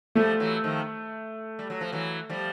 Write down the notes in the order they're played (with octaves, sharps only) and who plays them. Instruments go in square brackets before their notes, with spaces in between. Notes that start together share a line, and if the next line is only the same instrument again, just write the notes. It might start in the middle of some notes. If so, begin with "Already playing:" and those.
[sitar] F3 G3 [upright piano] A3
[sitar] E3 F#3
D#3 F3
G3
F#3
F3
E3 F#3
F3 G3